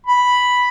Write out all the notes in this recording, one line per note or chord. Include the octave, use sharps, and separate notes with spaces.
B5